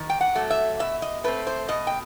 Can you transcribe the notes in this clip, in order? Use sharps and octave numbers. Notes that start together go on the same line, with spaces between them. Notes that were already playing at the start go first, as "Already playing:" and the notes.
Already playing: D#3
G5
F#5
F#3 A3
E5
B2 E5
D#5
A3 C4 B4
C5
B2 D#5
G5